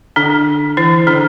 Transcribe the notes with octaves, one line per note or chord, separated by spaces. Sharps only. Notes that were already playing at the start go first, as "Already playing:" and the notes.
D3 D4
E3 E4
D3 D4